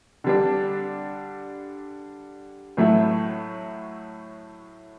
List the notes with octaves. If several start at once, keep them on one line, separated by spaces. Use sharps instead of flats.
D3 G3 D4
A2 F#3 A3 E4